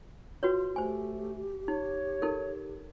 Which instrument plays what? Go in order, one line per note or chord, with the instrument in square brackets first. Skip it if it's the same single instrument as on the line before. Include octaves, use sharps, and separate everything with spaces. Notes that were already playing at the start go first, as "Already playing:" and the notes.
[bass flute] F4 [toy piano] F#4 B4 C#5
[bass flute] A3 [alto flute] G4 [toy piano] C5 G#5
[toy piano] D#4 [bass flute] C#5
[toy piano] D#4 A4 A#4